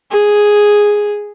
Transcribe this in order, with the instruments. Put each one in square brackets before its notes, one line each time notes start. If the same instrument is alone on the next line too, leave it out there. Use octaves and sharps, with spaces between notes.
[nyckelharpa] G#4